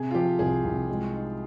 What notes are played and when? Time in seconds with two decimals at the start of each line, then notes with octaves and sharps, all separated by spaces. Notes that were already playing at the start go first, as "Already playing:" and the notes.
Already playing: C3 G#4
0.11 F4
0.15 F3 G4
0.39 C2 G#4
0.64 C2
0.89 G#3
1.13 D#4